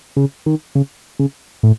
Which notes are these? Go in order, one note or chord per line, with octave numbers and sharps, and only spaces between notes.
C#3
D#3
C#3
C#3
A2